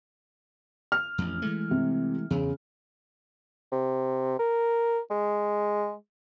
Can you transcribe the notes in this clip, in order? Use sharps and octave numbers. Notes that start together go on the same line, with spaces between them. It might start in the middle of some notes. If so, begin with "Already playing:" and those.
F6
A1 F2
E3 G#3 A3
C3
E2 C#3
C3
A#4
G#3